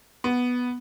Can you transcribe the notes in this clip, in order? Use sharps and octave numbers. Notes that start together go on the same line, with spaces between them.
B3